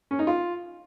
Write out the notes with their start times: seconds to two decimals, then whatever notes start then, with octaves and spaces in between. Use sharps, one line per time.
0.11 C#4
0.19 D#4
0.27 F4